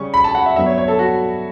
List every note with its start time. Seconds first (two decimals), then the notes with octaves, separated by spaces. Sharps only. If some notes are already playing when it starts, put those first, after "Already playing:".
Already playing: C#3 G3 C#4 C#6
0.14 B5
0.24 A5
0.35 F#5
0.46 E5
0.56 G2 F#3 B3 E5
0.66 C#5
0.78 C#5
0.88 A4
0.99 F#4